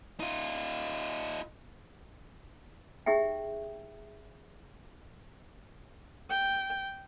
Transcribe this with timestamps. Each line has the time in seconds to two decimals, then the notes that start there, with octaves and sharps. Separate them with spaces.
0.20 D#4 F4
3.06 D#4 G4 G#4 E5 G5
6.30 G5